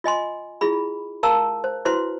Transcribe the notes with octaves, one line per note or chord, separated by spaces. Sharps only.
F4 D#5 G#5 C6
E4 F4 G#4 B5
A#4 F5 A5 A#5 E6
C5
E4 F#4 B4 C5 C6